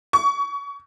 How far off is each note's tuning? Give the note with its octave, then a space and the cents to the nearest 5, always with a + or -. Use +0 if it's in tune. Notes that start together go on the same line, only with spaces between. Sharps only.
C#6 +30